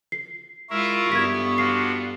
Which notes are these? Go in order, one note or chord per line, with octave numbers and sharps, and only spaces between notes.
C7
G#3 E4 F4 A#4 E5 C#6
G2 B3 A4 G#6 B6
D4 F4 F#4 C7